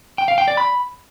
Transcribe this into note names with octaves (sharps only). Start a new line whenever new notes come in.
G5
F5
G5
D5
B5